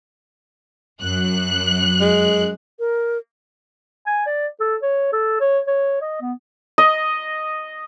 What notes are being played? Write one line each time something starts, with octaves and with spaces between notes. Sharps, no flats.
F#2 F#6
G#3
A#4
G#5
D5
A4
C#5
A4
C#5
C#5
D#5
B3
D#5